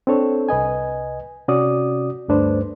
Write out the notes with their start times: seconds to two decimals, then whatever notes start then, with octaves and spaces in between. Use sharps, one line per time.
0.07 C4 D4 A4 C#5
0.49 C2 B4 D#5 G#5
1.48 C3 C#4 F#4 D5 D#6
2.28 D2 G2 A3 D4 B4 C5